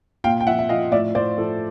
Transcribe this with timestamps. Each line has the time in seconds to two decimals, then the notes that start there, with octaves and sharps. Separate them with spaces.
0.24 A#2 F5 G5
0.41 G5
0.47 F3 E5 F#5
0.59 E5
0.69 F3 D#5 F5
0.92 A2 D5 E5
1.15 A2 C5 D5
1.38 F3 A4